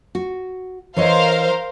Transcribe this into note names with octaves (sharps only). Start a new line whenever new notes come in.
F#4
E3 A#4 C5 C#5 D#5 F5